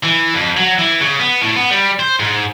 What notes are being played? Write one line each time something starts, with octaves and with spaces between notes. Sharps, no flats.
E3
F2
F#3
E3
C#3
B3
A2
B3
G3
C5
G#2